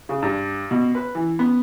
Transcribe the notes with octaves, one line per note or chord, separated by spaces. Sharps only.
C#3
G2
B2
B4
E3
B3